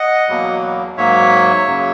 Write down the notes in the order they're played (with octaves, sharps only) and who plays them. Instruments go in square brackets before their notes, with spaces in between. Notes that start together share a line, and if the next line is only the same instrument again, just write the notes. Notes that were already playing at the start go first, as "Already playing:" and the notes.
Already playing: [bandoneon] D#5 F#5
E2 B2 F#3 A#3
G#2 F#3 A#3 C#5 E5
F#2 C#3 F#3 A#3